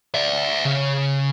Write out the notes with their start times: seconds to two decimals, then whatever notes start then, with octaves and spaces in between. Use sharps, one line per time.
0.14 D5 E5
0.65 C#3